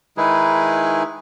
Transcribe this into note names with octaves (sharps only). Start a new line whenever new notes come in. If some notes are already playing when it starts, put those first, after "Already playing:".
D#3 G#3 D#4 E4 G#4 B4